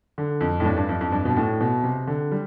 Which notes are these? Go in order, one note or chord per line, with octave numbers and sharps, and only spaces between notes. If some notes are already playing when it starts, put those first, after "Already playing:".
D3
F2
A2
G2
G2
F2
F2
G2
B2
A2
B2
C3
D3
G3